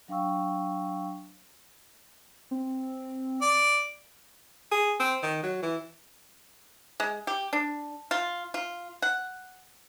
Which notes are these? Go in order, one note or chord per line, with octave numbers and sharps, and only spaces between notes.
F#3 D4 F5 G5 C#6 E6
C4
D5
G#4
C4
D#3
F#3
E3
G#3
G4
D4
F4
F4
F#5